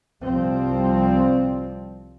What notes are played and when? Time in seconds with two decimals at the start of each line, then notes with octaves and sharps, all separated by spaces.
0.22 C2 F3 G3 C4